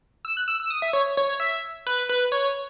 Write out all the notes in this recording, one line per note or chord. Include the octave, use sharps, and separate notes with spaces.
E6
F#6
E6
E6
D#6
E5
C#5
C#5
E5
B4
B4
C#5